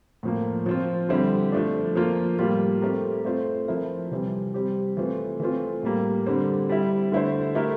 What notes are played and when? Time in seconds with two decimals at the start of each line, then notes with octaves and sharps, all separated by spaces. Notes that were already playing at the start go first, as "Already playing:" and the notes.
0.23 A2 F3 A#3
0.66 F3 C4 F4
1.09 D3 G3 C4 E4 G4
1.52 F3 A3 D4
1.95 F3 A#3 F4
2.39 A2 G3 A#3 F4
2.82 A3 C4 G4 A#4
3.25 A3 C4 F4 C5
3.68 F3 C4 E4 A#4
4.11 C3 E3 G3 C4
4.54 G3 C4 G4
4.97 E3 A3 C4 F4
5.40 E3 A3 C4 F4
5.83 A2 G3 A#3
6.26 D3 G3 C4
6.69 G3 C4 E4
7.12 D3 A3 E4 A4 C5
7.55 A3 E4 G4 A#4